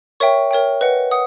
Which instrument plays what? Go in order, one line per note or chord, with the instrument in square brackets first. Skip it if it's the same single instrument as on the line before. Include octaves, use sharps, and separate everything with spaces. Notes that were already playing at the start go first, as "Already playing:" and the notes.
[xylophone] A#4 C#5 E5 G5 C#6
A#4 C#5 E5 G5
B4 D#5 F#5
F#5 D#6